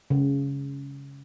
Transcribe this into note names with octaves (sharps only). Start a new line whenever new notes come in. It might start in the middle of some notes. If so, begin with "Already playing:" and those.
C#3